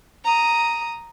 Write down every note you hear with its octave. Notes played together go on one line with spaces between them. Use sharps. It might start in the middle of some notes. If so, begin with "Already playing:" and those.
A#5 D#6